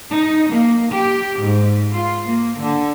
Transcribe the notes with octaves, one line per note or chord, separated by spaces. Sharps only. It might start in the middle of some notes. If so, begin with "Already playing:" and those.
D#4
A#3
G4
G#2
F4
A#3
D3